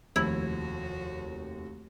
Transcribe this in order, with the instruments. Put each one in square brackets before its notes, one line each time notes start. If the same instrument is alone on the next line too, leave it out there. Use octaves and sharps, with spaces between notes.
[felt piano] F1 D#2 [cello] F3 F#4 [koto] E4